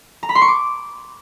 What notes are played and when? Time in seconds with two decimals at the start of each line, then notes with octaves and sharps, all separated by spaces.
0.23 A#5
0.29 B5
0.35 C6
0.42 C#6
0.48 D6